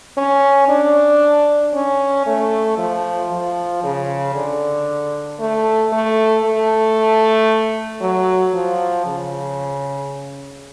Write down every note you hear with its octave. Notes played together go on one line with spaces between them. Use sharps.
C#4
D4
C#4
A3
F3
F3
C#3
D3
A3
A3
A3
F#3
F3
C#3